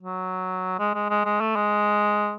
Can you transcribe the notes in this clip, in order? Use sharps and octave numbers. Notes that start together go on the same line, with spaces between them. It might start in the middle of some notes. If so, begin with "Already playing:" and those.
F#3
G#3
G#3
G#3
G#3
A3
G#3